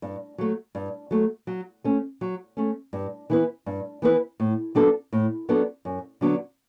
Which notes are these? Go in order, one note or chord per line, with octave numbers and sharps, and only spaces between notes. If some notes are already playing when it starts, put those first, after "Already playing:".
G2
F#3 A3
G2
F#3 A3
F#3
A3 C#4
F#3
A3 C#4
G2
E3 B3 E4 B4
G2
E3 B3 E4 B4
A2
F#3 B3 D4 A4
A2
F#3 B3 D4 A4
F#2
D3 F#3 B3 D4